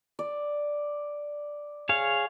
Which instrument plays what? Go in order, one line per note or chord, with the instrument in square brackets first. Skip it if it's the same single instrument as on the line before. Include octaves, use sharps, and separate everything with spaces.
[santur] D5
[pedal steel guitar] G#4 C#5 F5